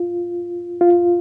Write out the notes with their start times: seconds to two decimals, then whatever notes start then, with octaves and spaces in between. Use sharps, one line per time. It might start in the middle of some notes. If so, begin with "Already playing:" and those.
Already playing: F4
0.81 F4